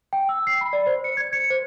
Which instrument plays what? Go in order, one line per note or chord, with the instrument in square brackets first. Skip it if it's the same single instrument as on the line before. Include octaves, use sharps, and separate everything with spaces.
[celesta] G5
E6
C7
B5
D5
C5
C#7
G#6
C#7
C5